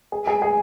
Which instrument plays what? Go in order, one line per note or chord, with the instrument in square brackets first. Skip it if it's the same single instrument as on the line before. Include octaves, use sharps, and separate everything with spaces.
[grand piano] G#4
G#4
G#4